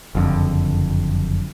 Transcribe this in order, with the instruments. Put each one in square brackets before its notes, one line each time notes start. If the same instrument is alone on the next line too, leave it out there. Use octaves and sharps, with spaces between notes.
[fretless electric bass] F#1 F2 D3